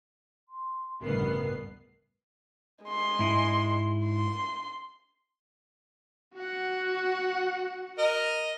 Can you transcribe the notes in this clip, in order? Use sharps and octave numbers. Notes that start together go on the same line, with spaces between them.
C6
A1 D2 G2 C#3 B3 A#4 C7
G#3 C6
G#2 E4 G#5
C6
F#4 F#5
A#4 D#5